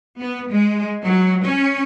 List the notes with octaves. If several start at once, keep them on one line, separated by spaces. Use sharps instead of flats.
B3
G#3
F#3
C#4